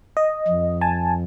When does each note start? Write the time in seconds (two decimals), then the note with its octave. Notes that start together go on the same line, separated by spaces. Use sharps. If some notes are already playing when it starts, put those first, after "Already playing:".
0.17 D#5
0.48 F2
0.81 G#5 A5